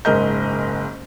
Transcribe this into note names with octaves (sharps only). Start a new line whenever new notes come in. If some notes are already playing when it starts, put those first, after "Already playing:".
F#1 G#2 A#4 D#5 G6